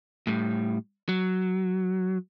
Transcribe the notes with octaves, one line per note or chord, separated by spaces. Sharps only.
A2 G3
F#3